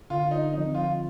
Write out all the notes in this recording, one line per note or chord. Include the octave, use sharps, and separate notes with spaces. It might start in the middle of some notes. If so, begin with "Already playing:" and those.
D3 F4
D#4
F3 C4 D#4
F4